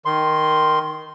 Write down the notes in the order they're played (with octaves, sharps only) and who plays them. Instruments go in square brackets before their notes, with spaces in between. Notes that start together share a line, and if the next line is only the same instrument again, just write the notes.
[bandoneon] D#3 C6